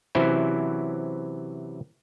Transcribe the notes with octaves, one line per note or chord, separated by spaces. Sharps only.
C3 E3 F#3 C#4 E4 C5